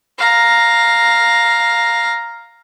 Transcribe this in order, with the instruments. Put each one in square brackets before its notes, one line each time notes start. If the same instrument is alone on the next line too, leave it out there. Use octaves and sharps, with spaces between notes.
[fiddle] F5 A#5